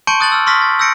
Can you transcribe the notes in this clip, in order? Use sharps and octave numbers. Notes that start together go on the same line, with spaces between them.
A5 C6 C#6 G6 C#7 D7
D#6 F#6 A6 D7 F#7
E6 F6
C6 C#6 D#6 F6 A#6 B6
A6
E6 G6 A#6 C#7 D7